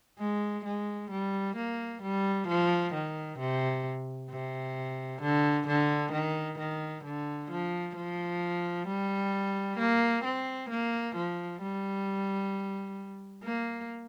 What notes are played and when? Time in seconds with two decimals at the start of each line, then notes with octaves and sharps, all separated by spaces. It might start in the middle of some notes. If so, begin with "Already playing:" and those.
0.19 G#3
0.65 G#3
1.10 G3
1.56 A#3
2.02 G3
2.48 F3
2.93 D#3
3.39 C3
4.30 C3
5.22 D3
5.67 D3
6.12 D#3
6.58 D#3
7.04 D3
7.50 F3
7.96 F3
8.87 G3
9.78 A#3
10.24 C4
10.70 A#3
11.15 F3
11.61 G3
13.44 A#3